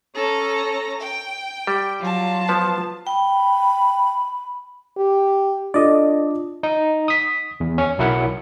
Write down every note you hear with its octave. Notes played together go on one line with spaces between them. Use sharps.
C#4 A4 A#5
G5
G3
F#3 F4 A5
F3 B3
G5 B5
G4
D4 F4 A4 D5 D#5
D#4
D#6 B6
E2
C#4
B1 F#3 E4 A#4 F#5